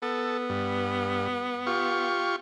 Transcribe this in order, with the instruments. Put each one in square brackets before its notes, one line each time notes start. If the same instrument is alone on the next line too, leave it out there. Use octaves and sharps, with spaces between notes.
[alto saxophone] B3 [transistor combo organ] A4
[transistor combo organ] G2
F4 G4 C#6